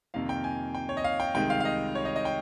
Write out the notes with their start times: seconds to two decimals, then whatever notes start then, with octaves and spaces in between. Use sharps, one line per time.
0.14 F2 C3 D#3 A#3 F5
0.29 G5
0.44 G#5
0.75 G5
0.89 C#5
0.97 D#5
1.04 F5
1.20 G5
1.35 C2 C3 D#3 G#3 G5
1.50 F5
1.60 F5
1.65 D#5
1.95 C#5
2.05 D#5
2.16 D#5
2.25 G5